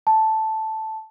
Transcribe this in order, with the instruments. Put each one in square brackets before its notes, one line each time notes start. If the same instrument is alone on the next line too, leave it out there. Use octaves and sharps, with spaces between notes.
[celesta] A5